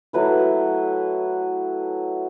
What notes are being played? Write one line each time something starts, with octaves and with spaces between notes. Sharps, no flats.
F#3 A3 E4 B4